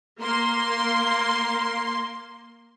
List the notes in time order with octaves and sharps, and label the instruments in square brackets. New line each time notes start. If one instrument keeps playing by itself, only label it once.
[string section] A#3 C6